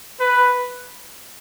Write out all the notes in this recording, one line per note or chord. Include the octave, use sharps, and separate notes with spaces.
B4